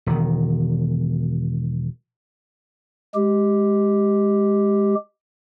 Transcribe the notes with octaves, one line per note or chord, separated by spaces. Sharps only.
E1 D#3
G#3 G4